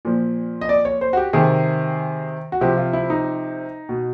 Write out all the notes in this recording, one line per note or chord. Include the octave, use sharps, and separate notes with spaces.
A#2 F3
D#5
D5
C#5
C5
F#4
G4
C3 D#3 G#4
F#4
C3 F3 G4
F4
E4
D#4
B2